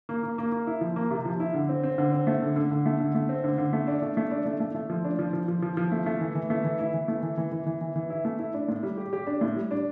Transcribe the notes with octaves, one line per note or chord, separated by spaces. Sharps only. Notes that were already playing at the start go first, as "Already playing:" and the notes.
A#3
A#3
A#3
A#3
E4
F3
A#3
C3
F3
E4
D3
C4
C4
D3
C4
A3
D3
D3
D3
A3
D3
A3
C4
D3
D3
A3
D4
A3
A3
D4
A3
A3
A3
F3
D4
F3
F3
F3
F3
F3
A3
A3
E3
E3
A3
E3
E4
E3
A3
E3
E3
E3
E3
E3
E3
E4
A3
E4
D4
A2
G3
G4
G4
D4
A2
G3
D4